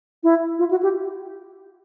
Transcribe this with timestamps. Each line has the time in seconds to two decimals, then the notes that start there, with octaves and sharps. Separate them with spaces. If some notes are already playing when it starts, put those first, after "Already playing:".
0.23 E4
0.59 F4
0.71 F#4
0.83 G4